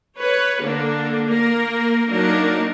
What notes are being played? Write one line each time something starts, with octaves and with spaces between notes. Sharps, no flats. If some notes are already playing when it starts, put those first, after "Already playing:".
B4 C#5
D3 A#3 D4
A#3 A#4
F#3 A#3 D4 D#4 A#4